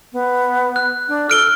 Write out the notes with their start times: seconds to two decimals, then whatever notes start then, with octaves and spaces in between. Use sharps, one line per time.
0.13 B3
0.76 F#6
1.08 D4
1.30 A4 F6 D7 G7